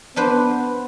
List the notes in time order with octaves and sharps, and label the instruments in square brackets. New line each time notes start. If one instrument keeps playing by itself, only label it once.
[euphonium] B3 [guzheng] D4 B4 C5